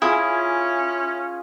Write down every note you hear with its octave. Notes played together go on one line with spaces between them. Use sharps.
C#4 E4 F4 G#4